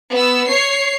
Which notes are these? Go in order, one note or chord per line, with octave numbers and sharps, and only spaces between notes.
B3 E6
C#5 C7